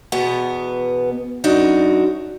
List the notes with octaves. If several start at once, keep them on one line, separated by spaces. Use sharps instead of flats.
E2 B2 B3 B4
F#2 D4 D#4 F#4